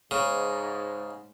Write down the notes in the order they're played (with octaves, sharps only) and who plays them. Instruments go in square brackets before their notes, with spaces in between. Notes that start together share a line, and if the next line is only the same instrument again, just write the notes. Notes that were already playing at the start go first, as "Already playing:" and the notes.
[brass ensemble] G#2 [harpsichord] C#3